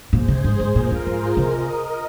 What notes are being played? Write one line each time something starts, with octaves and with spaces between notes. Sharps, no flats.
A#2 G#4 C5
C3
G#2
G#2
A#2 F4 A#4
F2
G#2 G#4 C5
C3 A#4 D#5